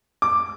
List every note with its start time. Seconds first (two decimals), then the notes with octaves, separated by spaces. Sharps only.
0.22 D6